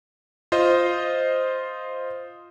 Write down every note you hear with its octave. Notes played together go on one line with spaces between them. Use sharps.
F4 C5 D#5